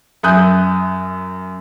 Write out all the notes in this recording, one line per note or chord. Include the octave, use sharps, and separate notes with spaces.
F#2 E5 G#5 D#6 F#6 G6